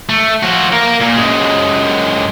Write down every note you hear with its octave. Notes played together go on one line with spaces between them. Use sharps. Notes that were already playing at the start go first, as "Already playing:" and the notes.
A3
F3 F#4
A#4 F5
A#2
F#2 G#3